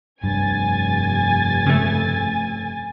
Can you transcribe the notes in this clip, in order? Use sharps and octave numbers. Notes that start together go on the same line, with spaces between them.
F1 G2 G#5 G#6 A6
C#3 A3